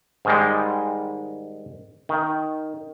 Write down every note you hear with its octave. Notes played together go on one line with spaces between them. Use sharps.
G#2 D#3 G3 G#3
D#3